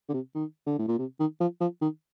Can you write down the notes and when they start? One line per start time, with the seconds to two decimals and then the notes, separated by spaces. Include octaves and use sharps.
0.09 D3
0.14 C3
0.34 D#3
0.66 D3
0.78 A2
0.88 A#2
0.99 C3
1.19 D#3
1.40 F3
1.60 F3
1.81 D#3